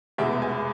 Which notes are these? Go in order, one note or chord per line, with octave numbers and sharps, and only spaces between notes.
F1 E2 B2 G#3 E5
G#5